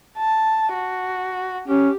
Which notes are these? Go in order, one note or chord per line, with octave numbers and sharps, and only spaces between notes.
A5
F#4
C#4 G4